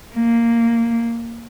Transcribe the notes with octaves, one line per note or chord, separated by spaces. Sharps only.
A#3